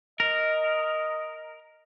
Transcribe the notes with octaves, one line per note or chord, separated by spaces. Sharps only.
A#4 D#5